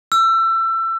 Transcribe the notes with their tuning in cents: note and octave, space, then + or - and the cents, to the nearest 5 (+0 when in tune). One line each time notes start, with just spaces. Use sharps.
E6 +25